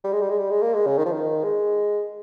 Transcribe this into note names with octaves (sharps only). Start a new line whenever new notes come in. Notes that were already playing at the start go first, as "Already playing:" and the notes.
G3
G#3
G3
G#3
G3
G#3
A#3
G#3
C#3
D#3
F3
D#3
G#3